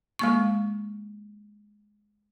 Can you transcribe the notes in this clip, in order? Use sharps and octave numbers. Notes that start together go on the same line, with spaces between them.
G#3 A#3 C#6